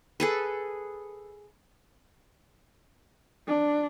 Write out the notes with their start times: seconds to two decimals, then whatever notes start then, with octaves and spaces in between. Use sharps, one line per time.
0.20 G#4 A4 B4
3.47 D4